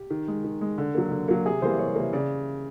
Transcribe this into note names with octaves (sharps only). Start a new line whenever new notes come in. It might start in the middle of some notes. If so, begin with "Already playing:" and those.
Already playing: G4
D#3
G#3
D#3
G#3
D3
F#3 A#3
D3
F#3 A#3
C3 G#4
E3 G3 A#3 C5
C3 C#5
E3 G3 A#3
C#3 D5